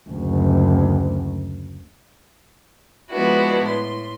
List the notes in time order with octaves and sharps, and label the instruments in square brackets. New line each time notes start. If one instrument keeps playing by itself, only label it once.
[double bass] F#1 D2
[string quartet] F3 G#3 B3 D4 E4 F#4
A2 C6